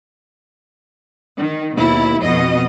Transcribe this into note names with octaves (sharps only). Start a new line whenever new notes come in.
D#3
D#2 B2 E4
F2 B2 D#5